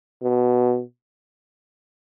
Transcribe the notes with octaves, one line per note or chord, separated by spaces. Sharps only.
B2